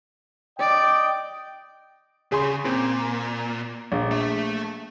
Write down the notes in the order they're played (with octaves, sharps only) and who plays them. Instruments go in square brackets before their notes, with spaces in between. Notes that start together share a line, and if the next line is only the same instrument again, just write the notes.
[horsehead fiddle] D5 [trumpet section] D#5 G5
[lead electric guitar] C#3 [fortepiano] G#4 C6
[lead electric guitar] A#2 [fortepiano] C4
[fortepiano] A#1
[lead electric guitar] A3 E5